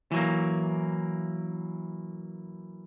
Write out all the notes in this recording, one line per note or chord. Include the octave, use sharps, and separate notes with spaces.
E3 F#3 A#3